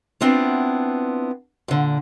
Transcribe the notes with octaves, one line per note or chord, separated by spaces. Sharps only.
B3 C4 D4 E4 F4
A#2 D3